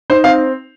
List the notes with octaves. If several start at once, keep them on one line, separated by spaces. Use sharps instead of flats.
D#4 C5
C4 F5